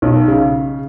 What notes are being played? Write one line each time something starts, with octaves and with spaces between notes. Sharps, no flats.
B1
C#3